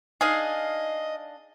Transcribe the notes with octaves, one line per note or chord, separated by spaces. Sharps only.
D4 D#4 G#4 D#5 F5